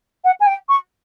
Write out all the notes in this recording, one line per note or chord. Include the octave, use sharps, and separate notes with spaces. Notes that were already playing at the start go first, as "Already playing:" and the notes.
F#5
G#5
G5
C#6